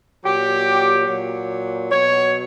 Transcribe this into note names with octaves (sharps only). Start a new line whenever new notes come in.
A#2 F#3 G4
A#2 F#3
B2 F#3 C#5